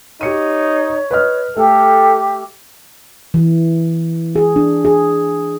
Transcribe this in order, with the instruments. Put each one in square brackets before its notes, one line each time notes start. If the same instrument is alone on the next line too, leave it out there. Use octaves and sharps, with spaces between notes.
[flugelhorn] D#4 [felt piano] G4 C#7 D#7 [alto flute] C#5
[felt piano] B4 D#5 F6
[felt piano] A3 [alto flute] G4 [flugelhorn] A4
[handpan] E3
G#4
D4
G#4